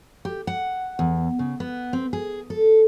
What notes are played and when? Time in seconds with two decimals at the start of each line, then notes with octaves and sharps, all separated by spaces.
0.25 G4
0.47 F#5
0.99 E2
1.39 C#3
1.60 B3
1.93 C4
2.13 G#4
2.50 A4